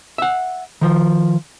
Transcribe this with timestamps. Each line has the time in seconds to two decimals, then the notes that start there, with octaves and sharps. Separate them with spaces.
0.18 E5 F#5
0.81 D#3 F3